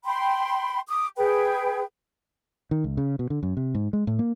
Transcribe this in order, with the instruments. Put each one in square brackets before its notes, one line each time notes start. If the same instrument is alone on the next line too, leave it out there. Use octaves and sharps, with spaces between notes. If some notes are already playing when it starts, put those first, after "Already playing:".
[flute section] G5 B5 C6
D6 D#6
G#4 B4 G5
[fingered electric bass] D#3
C#2
C#3
B2
D3
F#2
C3
G#2
G#3
A2
A#3